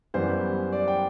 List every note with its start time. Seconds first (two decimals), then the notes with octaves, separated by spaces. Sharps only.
0.14 F#2 E3 G3 B3 C5
0.73 D5
0.88 G5